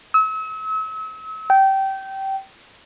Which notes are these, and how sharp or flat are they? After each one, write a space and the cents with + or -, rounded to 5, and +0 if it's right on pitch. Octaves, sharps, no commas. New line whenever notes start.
E6 -40
G5 -20